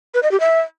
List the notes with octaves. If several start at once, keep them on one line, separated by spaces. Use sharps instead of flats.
B4
D#5
G4
E5